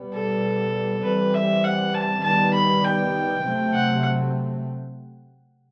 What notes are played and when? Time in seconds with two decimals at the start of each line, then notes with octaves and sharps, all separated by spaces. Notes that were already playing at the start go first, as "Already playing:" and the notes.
Already playing: B2 G3 B3
0.14 A4
1.03 E3 G3 C4 B4
1.34 E5
1.64 F#5
1.94 A5
2.23 D#3 G3 B3 A5
2.53 B5
2.84 G5
3.43 C3 F#3 A3 C4
3.73 F#5